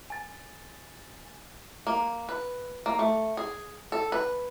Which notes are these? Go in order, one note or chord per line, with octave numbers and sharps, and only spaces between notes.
G#5 A6
A#3
B4
A#3
A3
G#4
A4
B4